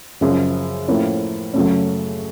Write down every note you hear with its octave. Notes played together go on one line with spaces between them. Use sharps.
F#2 C#3 F3 G#3
A2 F3 A#3 C#4 E4
F#2 C#3 F#3 A3 C#4